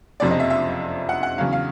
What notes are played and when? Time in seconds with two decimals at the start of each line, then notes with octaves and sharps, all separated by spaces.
0.20 F#1 F2 C3 F3 D5
0.31 D#5
0.40 E5
0.50 E5
1.09 F#5
1.23 F#5
1.38 E2 C#3 F#3 F5
1.52 F5